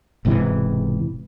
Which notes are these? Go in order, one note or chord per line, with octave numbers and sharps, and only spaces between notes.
E1 G#2 C3 E3